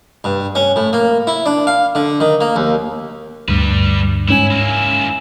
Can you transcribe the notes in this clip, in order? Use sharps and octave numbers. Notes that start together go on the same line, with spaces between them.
G2
C#4
A2
A#3
E4
D4
F5
D3
D#3
A#3
D#2
D2 G2 G3 B4
G#2 C#4 E4 G#5
A#3 E4